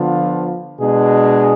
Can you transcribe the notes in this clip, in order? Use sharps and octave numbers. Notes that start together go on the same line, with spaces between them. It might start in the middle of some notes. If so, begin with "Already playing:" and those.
Already playing: D3 F3 B3 F4
B2 G#3 D4 G#4